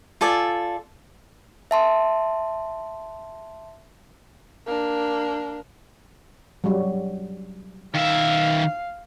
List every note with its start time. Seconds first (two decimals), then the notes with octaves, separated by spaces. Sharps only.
0.21 F4 A4 D5 G#5
1.71 E5 A5 C6
4.67 A#3 D4
6.64 F#3 G3
7.95 D#3 E5 F5